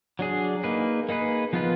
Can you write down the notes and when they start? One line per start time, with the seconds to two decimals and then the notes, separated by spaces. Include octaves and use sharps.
0.19 F#3 D4 G#4
0.64 A#3 D#4 G#4 B4
1.09 A#3 D#4 G#4 B4
1.53 F3 B3 F4 B4